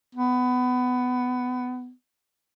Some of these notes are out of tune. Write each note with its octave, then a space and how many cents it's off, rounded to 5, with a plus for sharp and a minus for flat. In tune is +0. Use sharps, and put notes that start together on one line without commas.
B3 +20